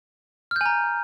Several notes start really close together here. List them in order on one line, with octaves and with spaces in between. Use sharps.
F6 G6 G#5 A#5